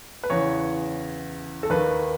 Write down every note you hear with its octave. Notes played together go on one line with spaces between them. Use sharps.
B4
E2 C#3 E3 C#5
A4
D#2 D#3 B4